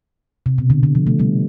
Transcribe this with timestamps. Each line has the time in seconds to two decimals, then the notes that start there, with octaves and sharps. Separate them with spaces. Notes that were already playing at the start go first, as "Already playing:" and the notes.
0.46 C3
0.58 B2
0.70 D3
0.83 D3
0.95 F3
1.07 A3
1.19 G3 B3